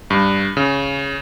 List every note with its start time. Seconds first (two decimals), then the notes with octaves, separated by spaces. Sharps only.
0.10 G2
0.57 C#3